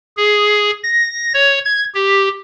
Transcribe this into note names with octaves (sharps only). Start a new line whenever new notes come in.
G#4
A#6
C#5
G#6
G4